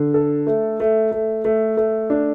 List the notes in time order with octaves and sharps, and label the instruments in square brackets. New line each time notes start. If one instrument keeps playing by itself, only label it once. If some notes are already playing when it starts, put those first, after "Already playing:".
Already playing: [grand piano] D3
A4
A3
A3
A3
A3
A3
D4